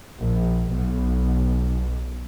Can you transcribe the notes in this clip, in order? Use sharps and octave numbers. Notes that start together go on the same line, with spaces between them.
A#1
B1